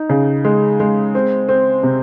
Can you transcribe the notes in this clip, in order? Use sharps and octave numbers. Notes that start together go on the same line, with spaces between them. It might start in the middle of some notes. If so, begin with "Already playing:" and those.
Already playing: D#4
C#3
G#3
G#3
C4
C4
C3